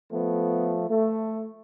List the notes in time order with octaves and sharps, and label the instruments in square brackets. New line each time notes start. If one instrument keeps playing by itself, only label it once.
[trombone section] F3 A3 B3
A3